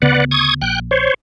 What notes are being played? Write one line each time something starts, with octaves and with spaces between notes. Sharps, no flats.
D2 C#3 B3 B4 D5 F#5
C#6 D#6 G#6
A#1 G5 F#6
C5 C#5